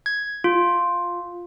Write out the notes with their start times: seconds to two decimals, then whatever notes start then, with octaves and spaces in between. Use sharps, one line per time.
0.06 G#6
0.44 F4